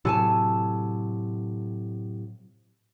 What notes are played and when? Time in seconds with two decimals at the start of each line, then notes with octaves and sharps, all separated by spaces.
0.05 A2 C3 F#3 A4 G#5 A5